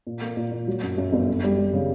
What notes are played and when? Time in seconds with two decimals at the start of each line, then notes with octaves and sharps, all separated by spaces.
0.07 A#2
0.22 A#3
0.37 A#2
0.52 A#2
0.67 F#3
0.83 F#2
0.98 F#2
1.13 G1
1.28 F#2
1.44 G3
1.58 G3
1.73 C#3